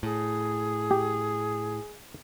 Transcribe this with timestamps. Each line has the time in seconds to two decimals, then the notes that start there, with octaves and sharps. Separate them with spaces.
0.03 A2 G#4
0.91 G4